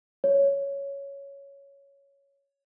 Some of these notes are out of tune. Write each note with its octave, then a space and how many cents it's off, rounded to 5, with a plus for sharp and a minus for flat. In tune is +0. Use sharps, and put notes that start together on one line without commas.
C#5 +5